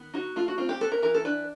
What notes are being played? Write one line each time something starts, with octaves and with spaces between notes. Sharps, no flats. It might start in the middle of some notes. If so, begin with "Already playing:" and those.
Already playing: D#3 B3
D#4 F#4
A3 F4
F#4
C4 F4
G4
B3 A4
A#4
E3 A#4
A4
D4 B4